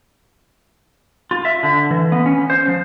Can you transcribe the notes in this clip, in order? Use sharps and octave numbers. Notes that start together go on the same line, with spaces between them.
F4
E5
D3
E3
B3
C#4
C5
F3